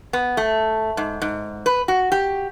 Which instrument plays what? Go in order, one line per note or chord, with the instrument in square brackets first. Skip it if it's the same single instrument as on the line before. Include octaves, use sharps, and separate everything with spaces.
[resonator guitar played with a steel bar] B3
A3
G#2
G#2
B4
F#4
G4